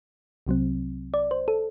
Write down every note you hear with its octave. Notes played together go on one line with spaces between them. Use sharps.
C2 C3 F#3 C4
D5
C5
A4